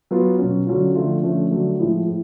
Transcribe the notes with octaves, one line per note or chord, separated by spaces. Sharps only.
F#3 B3 F4
B2 F#3 C#4
D3 F#3 C#4 F4
D3 F3 A3 F4
D3 F3 A3 C#4
D3 F#3 A3
A2 F3 G#3
A2